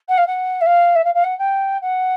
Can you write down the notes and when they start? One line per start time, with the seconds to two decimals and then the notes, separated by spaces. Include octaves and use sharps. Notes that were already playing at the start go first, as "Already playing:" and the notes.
0.08 F#5
0.17 F5
0.27 F#5
0.61 E5
0.66 F5
0.95 E5
1.04 F5
1.14 F5
1.24 F#5
1.38 G5
1.81 F#5